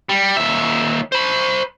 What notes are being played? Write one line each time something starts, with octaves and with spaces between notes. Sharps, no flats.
G3
D#2 E5
C5 B5